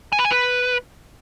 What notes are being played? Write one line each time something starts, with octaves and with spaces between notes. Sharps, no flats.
G#5
B4
G#5
B4